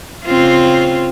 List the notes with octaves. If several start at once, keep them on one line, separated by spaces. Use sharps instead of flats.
C#3 C4 F4